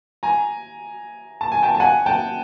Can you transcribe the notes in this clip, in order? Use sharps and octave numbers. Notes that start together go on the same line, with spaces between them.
G#5 A#5
A5
G#5
G5 A5
A5
F#5 G#5
G5 A5